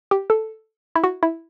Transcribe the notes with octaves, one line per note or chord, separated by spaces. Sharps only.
G4
A4
E4
F#4
E4